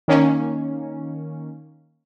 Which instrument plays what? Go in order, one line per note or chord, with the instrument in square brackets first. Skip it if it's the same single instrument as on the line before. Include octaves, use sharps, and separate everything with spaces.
[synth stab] D#3 A#3 C#4